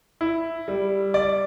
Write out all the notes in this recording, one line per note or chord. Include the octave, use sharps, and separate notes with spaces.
E4
G3
D5